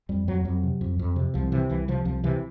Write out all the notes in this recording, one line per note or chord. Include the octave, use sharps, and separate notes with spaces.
F2 G3
F2 F#3
F2 F#3
C3
F2
F2
C3
C2 F3
C3 E3
C2 E3
C3 F3
C2 F3
C3 E3